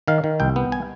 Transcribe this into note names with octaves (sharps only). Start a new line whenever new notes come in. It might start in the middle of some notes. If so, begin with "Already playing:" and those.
D#3 F5
D#3
C2 G5
B3
G#5